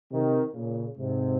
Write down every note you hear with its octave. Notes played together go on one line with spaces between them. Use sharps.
C3 D#3
A#2 C#3
G#2 C3